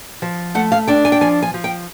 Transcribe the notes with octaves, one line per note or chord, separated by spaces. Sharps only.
F3
A3 F#5
F5
D4 G5
G#5
G5
F3 G#5
G#5
F3
G5